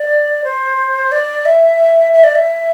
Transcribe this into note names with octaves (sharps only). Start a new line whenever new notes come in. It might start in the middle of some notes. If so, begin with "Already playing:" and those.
Already playing: D5
C5
D5
E5
E5
D5
E5